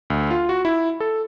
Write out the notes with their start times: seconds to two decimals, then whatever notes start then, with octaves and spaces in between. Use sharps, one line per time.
0.10 D2
0.31 F4
0.49 F#4
0.65 E4
1.00 A4